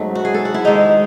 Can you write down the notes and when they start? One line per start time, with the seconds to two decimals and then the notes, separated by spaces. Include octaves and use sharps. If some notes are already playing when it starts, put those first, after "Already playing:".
Already playing: G#2 F#3 A3 C#4
0.15 F#4
0.25 G#4
0.34 A4
0.45 F#4
0.54 E4
0.65 G#2 D#3 G#3 D#4